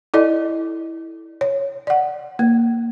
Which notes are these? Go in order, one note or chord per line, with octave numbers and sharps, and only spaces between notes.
E4 A4 D5 D#5
C#5
D5 F#5
A#3